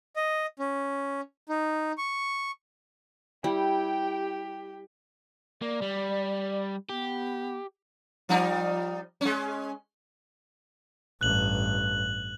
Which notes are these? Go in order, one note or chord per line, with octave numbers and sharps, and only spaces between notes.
D#5
C#4
D#4
C#6
G3 E4 G4 G5
A#3 D5
G3
B3 G4
F3 G3 D#4
G#3 C#4
A1 G2 F#6 F#7